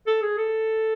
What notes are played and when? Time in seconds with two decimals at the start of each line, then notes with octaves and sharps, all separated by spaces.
0.07 A4
0.22 G#4
0.38 A4